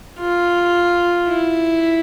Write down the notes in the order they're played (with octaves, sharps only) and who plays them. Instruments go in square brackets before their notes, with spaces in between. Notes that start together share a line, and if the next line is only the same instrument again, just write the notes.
[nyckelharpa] F4
E4